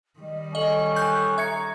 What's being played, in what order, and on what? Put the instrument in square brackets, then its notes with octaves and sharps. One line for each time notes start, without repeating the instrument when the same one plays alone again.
[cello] D#3 G3 [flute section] D#5
[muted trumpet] C#4 [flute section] A4 [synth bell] D#5 F#7
[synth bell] G#5 F#6 G6
[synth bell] E5 G#6 C#7 [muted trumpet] A#5